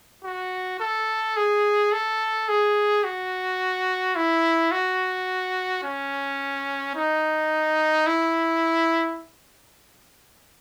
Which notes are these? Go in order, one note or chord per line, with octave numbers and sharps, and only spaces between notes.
F#4
A4
G#4
A4
G#4
F#4
E4
F#4
C#4
D#4
E4